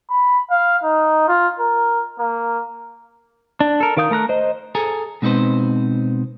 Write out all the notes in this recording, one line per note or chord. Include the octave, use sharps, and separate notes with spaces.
B5
F5
D#4
F4
A#4
A#3
D4
A4 A#4
D#3 A#4 F5 D#6 G6
A3 A#4 A#5 F#6
C5 D#5
G#4 A4 G#5 A#5
B2 G#3 C4 D#4 B4 C5